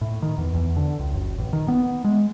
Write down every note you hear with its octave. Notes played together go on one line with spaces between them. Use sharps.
A2
D#3
E2
E2
D3
C#2
F#1
A1
D#3
B3
G#3